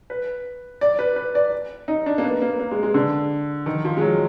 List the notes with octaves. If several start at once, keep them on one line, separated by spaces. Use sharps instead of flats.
B4
D5
B4
B4
D5
D#4
D4
A#3
B3
A#3
A#3
G#3
G#3
D3
D#3
F3
G#3
F#3